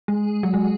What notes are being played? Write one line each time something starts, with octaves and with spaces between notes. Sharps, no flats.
G#3
F#3
G#3